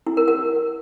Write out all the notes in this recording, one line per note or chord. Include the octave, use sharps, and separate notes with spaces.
E4
A#4
A#4